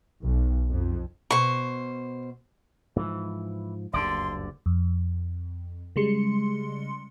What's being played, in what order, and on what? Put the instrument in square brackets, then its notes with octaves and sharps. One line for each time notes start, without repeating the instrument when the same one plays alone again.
[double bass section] B1
F2
[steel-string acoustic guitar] B2 C5 [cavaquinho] C#6
[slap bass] G#2 F3 [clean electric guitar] E3
[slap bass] F#1 D2 G2 [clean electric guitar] D3 D5 [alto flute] C6
[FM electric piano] F2
C#3 G3 G#3 C6 C#7